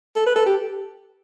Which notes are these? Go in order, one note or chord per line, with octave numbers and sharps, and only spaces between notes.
A4
B4
A4
G4